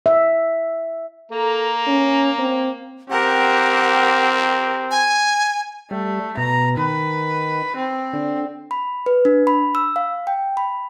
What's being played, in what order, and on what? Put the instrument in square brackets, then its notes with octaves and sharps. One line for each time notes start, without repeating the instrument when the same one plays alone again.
[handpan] E5
[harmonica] A#3 A#5 [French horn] A4
[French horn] C#4
C4
[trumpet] C4 [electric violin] G4 A#4 [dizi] F#5
[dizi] G#5
[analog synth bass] G3 [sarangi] A3
[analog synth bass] B2 [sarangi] A#5
[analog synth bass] D#3 [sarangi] B4
[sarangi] C4
[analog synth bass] D3
[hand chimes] B5
B4
D4
B5
E6
F5
G5
B5